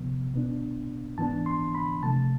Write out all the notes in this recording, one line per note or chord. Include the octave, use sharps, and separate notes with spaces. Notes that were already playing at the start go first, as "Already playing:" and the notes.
Already playing: C2 C3 F3 B3
C2 B2 B3 D4
G#2 E3 B3 D4 A5
C6
B5
C3 F3 A3 A5